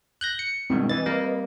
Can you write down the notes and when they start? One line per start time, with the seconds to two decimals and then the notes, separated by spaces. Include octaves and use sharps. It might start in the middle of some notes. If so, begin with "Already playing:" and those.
0.21 F#6 G6 A#6
0.39 C#7
0.70 G2 B2 D#3 G#3 C4 E4
0.90 E3 B4 D#5 A6
1.06 G3 A#3